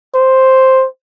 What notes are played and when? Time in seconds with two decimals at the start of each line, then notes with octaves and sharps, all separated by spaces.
0.15 C5